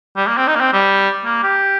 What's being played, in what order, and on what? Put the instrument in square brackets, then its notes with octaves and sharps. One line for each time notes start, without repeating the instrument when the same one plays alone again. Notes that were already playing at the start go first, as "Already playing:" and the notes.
[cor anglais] G3
A#3
C4
D#4
A#3
C4
G3
A#3
G4